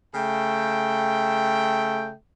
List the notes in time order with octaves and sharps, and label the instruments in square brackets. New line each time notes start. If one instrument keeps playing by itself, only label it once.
[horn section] C#3 A3 G5